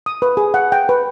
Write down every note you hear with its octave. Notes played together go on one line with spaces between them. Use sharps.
D#6
B4
G#4
F#5
G5
B4